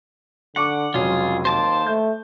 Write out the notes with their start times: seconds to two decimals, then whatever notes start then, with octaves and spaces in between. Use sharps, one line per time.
0.56 D3 F#5 C#6 D6
0.94 F1 C#2 F#3 F4 G#4 C#5
1.45 D#2 C5 A5 D6
1.86 A3 G6